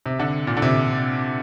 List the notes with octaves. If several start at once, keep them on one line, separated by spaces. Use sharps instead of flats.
C3
D3
A#2
D3
C3